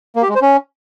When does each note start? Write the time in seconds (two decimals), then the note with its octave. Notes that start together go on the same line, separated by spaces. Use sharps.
0.16 A#3
0.22 G4
0.29 G#3
0.35 C5
0.42 C#4